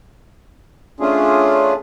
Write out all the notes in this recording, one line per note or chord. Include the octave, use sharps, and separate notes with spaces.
A3 C#4 D4 F4 G#4